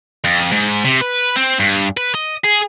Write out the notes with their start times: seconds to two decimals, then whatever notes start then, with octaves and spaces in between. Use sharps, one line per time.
0.24 F2
0.52 G#2
0.85 C3
1.01 B4
1.36 C4
1.60 G2
1.97 B4
2.15 D#5
2.44 G#4